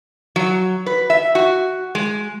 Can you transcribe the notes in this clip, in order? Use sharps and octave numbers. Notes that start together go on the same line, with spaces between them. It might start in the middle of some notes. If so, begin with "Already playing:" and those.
F#3
B4
E5
F#4
G#3